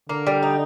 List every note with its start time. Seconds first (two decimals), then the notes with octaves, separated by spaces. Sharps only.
0.09 D3 A#3
0.27 G3
0.43 D#4